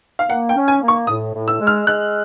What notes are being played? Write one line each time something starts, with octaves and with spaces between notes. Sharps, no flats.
F5
A#3 F#5
G5
C#4
G#5
A#3
C#6
A2 D#6
A2
E6
G#3
F6
G#3 F#6